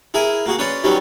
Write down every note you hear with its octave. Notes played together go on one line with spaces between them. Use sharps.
E4 G#4 A#4 G#5
A#3 F#4 G#4
C#4 B4 C#5 D5 C6
D#3 F#3 G3 B3 C#4